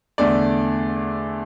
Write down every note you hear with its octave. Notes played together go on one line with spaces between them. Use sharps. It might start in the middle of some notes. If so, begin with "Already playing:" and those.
E2 D3 A3 D5